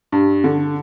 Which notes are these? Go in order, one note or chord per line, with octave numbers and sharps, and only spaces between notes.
G2
D3